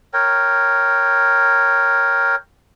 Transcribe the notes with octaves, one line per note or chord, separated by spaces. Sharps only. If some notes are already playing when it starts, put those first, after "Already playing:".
A#4 C#5 G5